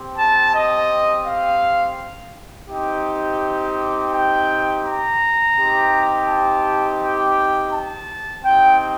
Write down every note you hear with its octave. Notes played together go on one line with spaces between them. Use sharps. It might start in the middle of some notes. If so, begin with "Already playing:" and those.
Already playing: C4 G4
A5
D#5
F5
C4 D#4 G4
G5
A#5
C4 D#4 G4
A5
G5
A5
C4 D#4 G4 G5